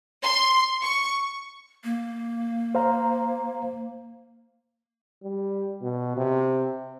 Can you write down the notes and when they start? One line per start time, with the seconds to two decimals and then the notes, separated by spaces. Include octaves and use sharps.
0.23 C6
0.83 C#6
1.84 A#3
2.75 C5 F5 A#5
5.23 G3
5.82 B2
6.17 C3